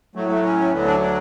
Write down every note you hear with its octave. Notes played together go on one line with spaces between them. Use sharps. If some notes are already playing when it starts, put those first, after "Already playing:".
A2 F#3 A3
A3
C#4
A3
D2 D3 F#3 B3
D4
D4